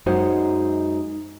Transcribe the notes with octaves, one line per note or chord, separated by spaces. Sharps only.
F#2 G#3 D#4 F#4 C5 F#5